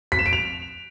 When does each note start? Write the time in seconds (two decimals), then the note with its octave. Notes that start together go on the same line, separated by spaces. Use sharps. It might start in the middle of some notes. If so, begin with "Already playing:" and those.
0.12 B6
0.19 E7
0.26 D7
0.33 F7